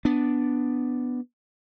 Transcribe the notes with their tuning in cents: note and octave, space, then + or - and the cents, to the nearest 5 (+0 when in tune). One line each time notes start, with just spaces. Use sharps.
B3 +5 D4 +0